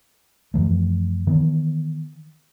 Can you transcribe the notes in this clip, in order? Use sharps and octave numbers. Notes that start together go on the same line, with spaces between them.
F#2 E3 F3 A3
D#3 E3 B3